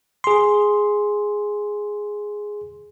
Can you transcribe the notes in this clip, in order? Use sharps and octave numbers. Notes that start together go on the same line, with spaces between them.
G#4 C6